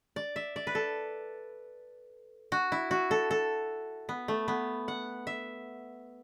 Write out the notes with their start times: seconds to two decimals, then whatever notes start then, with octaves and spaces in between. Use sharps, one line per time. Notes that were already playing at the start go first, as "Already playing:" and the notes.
0.16 D5
0.36 E5
0.56 D5
0.67 B4
0.75 A4
2.52 F#4
2.72 E4
2.91 F#4
3.11 A4
3.31 A4
4.09 B3
4.28 A3
4.48 B3
4.88 F#5
5.27 E5